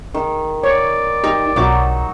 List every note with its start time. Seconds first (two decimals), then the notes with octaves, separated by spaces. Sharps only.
0.14 D#3
0.63 C#5 D5
1.24 D#4 G4
1.56 B1 F#3 D#4 F#4 D6